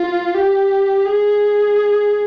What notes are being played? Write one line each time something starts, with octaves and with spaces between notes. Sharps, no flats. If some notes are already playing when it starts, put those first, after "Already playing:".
Already playing: F4
G4
G#4